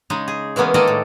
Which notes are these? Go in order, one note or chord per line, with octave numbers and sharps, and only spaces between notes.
C#3 G#3 D#4
G#4
E3 G#3 A#3 B3 C#4
D#3 G#3 A#3 A4 D5 D#5
A2